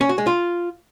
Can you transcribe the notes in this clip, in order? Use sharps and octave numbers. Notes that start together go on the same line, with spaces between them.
C#4
F#4
G#3
F4